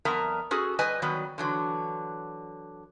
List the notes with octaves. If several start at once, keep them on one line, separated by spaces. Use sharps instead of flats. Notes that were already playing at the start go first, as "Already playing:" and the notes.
F2 G3 B3 A#4 E5 A#5
C#4 F#4 G#4 A4
G3 B4 D#5 G#5
D#3 F#3 G3 B3
D3 E3 F#3